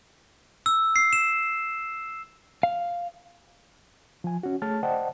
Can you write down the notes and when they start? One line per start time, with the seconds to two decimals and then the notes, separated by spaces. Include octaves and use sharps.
0.66 E6
0.96 C7
1.13 E7
2.63 F5
4.24 F3 G#5
4.43 C#4 F#4
4.62 A3 G#4 C#5 A5 F6 A6
4.83 C5 D5 D#5 F#5 G5 A5